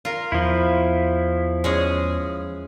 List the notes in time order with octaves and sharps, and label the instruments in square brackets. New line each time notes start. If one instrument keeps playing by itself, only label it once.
[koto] F4 A#4
[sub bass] E2 [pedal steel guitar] F3 E4
[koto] G#3 C#4 G#4